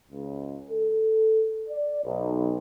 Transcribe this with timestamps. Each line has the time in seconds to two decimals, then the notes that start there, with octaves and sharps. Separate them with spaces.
0.10 C#2
0.70 A4
1.69 D5
2.04 B1